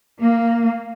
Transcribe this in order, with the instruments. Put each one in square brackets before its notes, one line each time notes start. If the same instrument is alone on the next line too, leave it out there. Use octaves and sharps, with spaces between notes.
[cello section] A#3